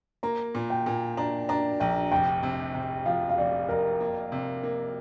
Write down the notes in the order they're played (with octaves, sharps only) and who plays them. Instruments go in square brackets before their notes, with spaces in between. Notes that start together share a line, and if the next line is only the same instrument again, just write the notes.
[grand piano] A#3 [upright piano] A#5
[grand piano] A#2
[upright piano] G5
[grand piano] A#2
[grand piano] D4 [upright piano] A#5
[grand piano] D4 [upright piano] A#5
[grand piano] A#1 [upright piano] G5
[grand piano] F1 [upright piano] G5
[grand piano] C3
C3
[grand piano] F3 [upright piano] F5
[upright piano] F5
[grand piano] F1 [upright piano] D5
[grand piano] F2 [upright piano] A#4
[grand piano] A#3
C3
A#3